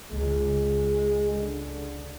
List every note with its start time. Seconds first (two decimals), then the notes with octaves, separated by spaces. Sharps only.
0.11 C#2 G#3
1.31 D3